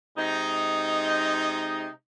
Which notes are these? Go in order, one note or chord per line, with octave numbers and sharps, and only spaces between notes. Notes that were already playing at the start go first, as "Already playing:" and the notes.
C3 G#3 D#4